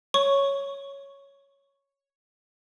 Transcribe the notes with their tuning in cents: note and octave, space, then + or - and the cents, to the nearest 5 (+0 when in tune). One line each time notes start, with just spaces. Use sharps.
C#5 +0 C#6 +0